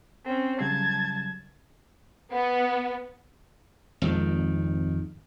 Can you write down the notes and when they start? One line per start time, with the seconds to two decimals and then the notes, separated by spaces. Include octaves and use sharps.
0.24 C4 C#4
0.60 C#3 F#3 G3 A5 G#6
2.32 B3
4.02 G#1 F2 D#3